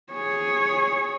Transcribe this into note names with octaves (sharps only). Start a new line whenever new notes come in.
G#4 C#5